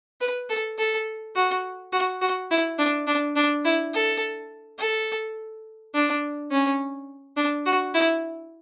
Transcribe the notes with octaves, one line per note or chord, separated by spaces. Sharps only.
B4
A4
A4
F#4
F#4
F#4
E4
D4
D4
D4
E4
A4
A4
D4
C#4
D4
F#4
E4